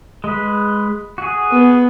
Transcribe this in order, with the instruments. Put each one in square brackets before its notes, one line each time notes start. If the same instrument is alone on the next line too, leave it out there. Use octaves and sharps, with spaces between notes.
[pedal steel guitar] G#3 B4
F#4 G#4
[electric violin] B3